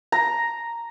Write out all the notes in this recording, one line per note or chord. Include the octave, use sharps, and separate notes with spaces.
A#5